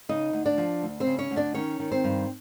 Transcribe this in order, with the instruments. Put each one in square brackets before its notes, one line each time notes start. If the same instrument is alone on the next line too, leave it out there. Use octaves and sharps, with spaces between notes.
[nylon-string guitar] C#3 D#4 D#5
D2
D4 D5
F3
D2
C4 C5
C#3
C#4 C#5
D2
D4 D5
D#3 C#4 C#5
D#3
C4 C5
G2